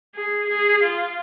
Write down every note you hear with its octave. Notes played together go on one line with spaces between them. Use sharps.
G#4
G#4
F4